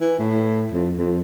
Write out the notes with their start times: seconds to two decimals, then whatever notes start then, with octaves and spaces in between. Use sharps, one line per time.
0.01 E3
0.19 A2
0.72 F2
0.97 F2